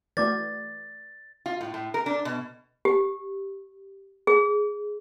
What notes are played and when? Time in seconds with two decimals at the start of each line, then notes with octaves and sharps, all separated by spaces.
0.17 E3 A3 F#4 B4 D5 D6 A6
1.46 F4
1.61 A2
1.74 A2
1.94 A#4
2.06 D4
2.25 B2
2.85 G4
4.27 G#4